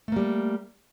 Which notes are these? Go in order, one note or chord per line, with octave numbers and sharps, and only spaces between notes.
G3 A3 A#3